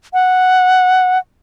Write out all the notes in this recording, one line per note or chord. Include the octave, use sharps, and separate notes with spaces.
F#5